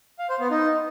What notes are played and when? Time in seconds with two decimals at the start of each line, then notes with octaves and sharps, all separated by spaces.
0.19 F5
0.30 C5
0.40 B3
0.51 D#4